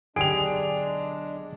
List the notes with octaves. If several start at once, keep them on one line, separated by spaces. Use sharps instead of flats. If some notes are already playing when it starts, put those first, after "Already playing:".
B1 D3 G#3 D4 G4 G#4 D7 F7